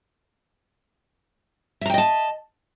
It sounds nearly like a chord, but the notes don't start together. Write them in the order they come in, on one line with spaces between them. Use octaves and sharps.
E5 A#5 G5 D#5 A5